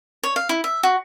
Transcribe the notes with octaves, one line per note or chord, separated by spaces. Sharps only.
C#5
F5
E4
E5
F#4